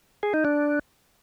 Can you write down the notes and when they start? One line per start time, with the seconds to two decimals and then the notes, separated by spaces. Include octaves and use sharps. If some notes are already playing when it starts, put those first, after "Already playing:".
0.23 G#4
0.34 D#4
0.45 D4